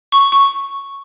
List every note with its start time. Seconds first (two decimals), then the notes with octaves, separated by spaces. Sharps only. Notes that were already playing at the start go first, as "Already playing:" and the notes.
0.12 C#6
0.32 C#6